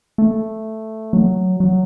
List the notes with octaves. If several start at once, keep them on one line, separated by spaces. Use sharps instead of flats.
A3
F#3
F#3